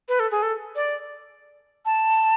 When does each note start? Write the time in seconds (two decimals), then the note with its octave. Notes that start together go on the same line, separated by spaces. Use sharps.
0.09 B4
0.20 A4
0.31 G#4
0.43 A4
0.76 D5
1.86 A5